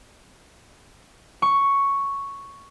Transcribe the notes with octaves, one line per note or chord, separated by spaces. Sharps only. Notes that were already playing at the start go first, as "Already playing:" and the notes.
C#6